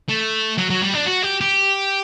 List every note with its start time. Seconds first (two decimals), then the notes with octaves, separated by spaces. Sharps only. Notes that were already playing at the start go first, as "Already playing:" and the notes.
0.08 A3
0.58 F#3
0.70 F#3
0.82 G3
0.94 D4
1.07 F#4
1.24 G4
1.41 G4